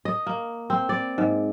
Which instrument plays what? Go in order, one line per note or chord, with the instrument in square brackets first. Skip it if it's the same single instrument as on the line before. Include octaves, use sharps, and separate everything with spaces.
[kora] D#5
A#3
C4
D5
G#2